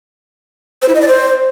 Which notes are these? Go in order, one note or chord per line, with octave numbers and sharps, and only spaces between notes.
C5
E4
D#5
D5
C5